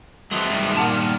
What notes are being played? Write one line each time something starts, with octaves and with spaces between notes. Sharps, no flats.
F#3 G#3 A3 B3 C4
G2 D#3
A#2 F#5 A5
F6